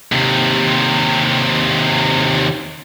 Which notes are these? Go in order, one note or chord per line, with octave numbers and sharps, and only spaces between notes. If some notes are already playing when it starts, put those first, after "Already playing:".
D#2 C3